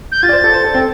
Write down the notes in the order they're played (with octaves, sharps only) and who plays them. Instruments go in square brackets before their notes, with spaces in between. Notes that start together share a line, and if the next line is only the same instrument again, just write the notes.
[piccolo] G6
[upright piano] F4 [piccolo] A6
[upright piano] D5
C5
A4
C5
A4
C4